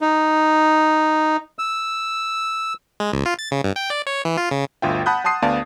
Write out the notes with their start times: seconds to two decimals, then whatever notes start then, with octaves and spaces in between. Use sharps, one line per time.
0.01 D#4
1.59 E6
3.00 G#3
3.12 C#2
3.26 F4
3.39 A6
3.51 C#3
3.64 G2
3.76 G5
3.90 D5
4.07 C#5
4.25 E3
4.37 F4
4.51 C#3
4.82 G1 D2 F4 E5 G5
5.06 F#5 A5 B5 D#6 F#6 G6
5.24 F#5 A5 C6 D#6 C7 D#7
5.42 D2 B3 D5 F5 A5